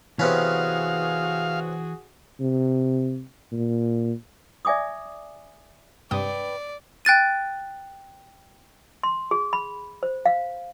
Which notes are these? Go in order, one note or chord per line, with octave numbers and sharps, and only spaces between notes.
C3 E3 B3 C#4 F#4 G#4 F5
C3
A#2
D5 E5 G#5 D6 D#6
G2 C3 B4 D5 G5 D#6
G5 F#6 A6 D#7
C6
G#4
B5
C5
F5